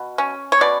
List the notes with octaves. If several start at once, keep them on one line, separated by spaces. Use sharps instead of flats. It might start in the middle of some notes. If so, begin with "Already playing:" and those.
Already playing: B2
C#4
C#5
B2 D5